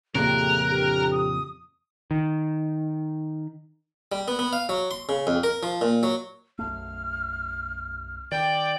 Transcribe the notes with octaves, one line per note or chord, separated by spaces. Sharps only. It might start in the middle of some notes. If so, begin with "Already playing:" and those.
F2 A#2 C#3 A3 G4 G#4 A#4 F#6
G2 D3 G4
D#6
D#3
G3
B3
B3
F5
F#3
C6
C#3
F2
A#4
F3
A#2
F#3
B1 F#2 A3 F6
D#3 D5 G5